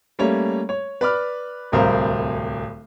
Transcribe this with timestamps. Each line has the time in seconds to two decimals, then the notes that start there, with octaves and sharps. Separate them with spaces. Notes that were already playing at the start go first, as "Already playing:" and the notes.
0.19 G3 A3 A#3 C#4 C#5
0.69 C#5
1.01 B4 D5 B5 D6 F6
1.72 D1 C2 A#4 C5 F5